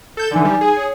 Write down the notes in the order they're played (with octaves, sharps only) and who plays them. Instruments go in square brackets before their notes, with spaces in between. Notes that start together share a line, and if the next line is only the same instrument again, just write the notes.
[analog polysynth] A4 G6 E7
[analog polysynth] D3 E3 [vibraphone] D#4 G#5
[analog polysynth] G3
G#4
[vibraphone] C#5